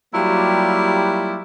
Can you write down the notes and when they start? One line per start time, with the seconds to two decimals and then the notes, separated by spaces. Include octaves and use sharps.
0.14 F#3 G3 A#3 E4 F4 G4